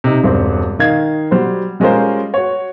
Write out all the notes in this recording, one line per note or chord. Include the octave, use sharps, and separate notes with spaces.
C3 D#4
E1 G2 C4
D#3 D#5 F5 G#6
F#3 G3 C5
G3 G#3 C#4 F4 A#4 C5
F#4 C#5